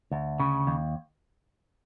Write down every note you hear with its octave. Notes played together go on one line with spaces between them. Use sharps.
D2
C#3
D#2